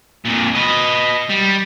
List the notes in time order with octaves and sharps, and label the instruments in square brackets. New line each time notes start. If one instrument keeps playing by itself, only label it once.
[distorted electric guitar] F2 A#2
B4 D#5
G3